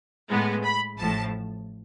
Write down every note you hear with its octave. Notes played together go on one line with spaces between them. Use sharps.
A2 G#3 B3
B5
A1 A2 F3 A5